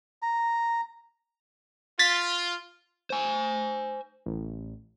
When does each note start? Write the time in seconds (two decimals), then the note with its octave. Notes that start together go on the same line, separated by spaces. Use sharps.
0.22 A#5
1.99 F4 A6 B6
3.10 C5 G#5
4.26 A1